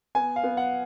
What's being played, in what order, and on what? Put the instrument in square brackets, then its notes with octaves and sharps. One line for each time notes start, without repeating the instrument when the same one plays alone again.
[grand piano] B3 G#5
F5
B3
F#5